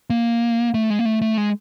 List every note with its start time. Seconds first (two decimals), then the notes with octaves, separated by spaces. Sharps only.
0.10 A#3
0.74 A3
0.90 G#3
0.99 A#3
1.05 A3
1.22 A3
1.37 G#3